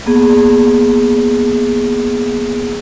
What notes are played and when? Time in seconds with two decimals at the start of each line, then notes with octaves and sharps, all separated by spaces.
0.06 A#3 B3 G#4